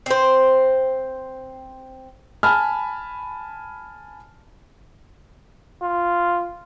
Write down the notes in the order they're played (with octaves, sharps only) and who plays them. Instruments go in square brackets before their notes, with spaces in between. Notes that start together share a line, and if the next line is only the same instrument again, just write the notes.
[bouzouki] C4 C5
[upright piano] G#5 A5 B5 F6
[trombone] F4